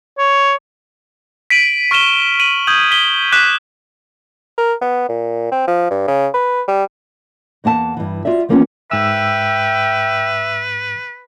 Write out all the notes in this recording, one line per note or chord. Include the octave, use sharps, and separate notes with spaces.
C#5
B6 D7 D#7 F#7
C#6 F6 B6 D#7 E7 G7
D#7 F#7
D#6 G6 G#6 F#7
B6 G7
D6 F#6 B6 E7
A#4
B3
A#2
C4
F3
G2
C#3
B4
G3
E2 A#3 F#5 A5
G2 E3
F4 F#4 D5 E5
E3 F3 A#3 B3 C#4 F4
G#2 B4 E5 G5 E6